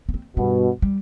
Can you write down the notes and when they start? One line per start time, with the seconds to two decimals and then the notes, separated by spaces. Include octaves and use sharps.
0.09 B3
0.14 C4
0.37 G2 B2 B3
0.82 G3